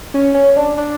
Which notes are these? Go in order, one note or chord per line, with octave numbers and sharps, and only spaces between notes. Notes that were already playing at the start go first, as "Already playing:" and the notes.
C#4
C#4
D4
D4